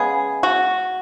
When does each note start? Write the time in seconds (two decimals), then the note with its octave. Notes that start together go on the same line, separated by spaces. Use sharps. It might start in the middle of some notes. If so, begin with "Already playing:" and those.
Already playing: C#3 G#3 B3 G#4
0.43 F#4